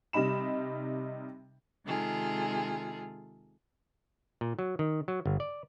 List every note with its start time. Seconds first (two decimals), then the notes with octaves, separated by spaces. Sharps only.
0.13 C3 G3 D#4 B5 E7
1.86 C3 D#3 G#3 F4 G#4 A4
4.41 A#2
4.59 F#3
4.79 D#3
5.08 F#3
5.26 G1
5.40 D5